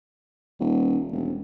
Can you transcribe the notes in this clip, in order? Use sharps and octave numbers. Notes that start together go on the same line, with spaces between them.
D#1
E1